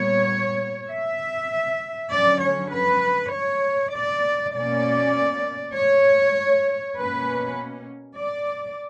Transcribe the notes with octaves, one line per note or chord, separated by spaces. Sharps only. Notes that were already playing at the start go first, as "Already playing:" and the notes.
Already playing: A#2 G3 B3 C#5
E5
D3 F#3 C#4 D5
C#5
B4
C#5
D5
B2 A#3 C#4 D5
C#5
B2 A#3 C#4 B4
D5